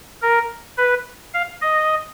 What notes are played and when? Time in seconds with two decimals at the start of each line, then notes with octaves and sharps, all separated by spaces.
0.22 A#4
0.78 B4
1.34 F5
1.61 D#5